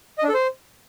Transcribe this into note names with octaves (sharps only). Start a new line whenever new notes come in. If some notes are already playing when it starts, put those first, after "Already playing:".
D#5
D4
A4
C5